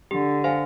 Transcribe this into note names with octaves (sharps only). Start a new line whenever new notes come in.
D3 G4
C5 F5 G#5